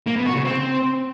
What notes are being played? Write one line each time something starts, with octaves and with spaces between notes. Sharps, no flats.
A#3
B3
F#4
C#3
C4